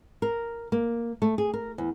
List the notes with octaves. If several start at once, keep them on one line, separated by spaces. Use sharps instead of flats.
A#4
A#3
A3
G#4
A#4
E2